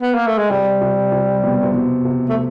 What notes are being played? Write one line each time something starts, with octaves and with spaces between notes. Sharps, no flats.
B3
A#3
A3
G#3
C3 G3
C3
C3
B2
C3
B2
C3
A3